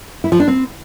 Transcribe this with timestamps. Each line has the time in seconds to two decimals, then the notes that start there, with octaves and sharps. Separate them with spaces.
0.24 E4
0.32 F3
0.40 D4
0.48 C4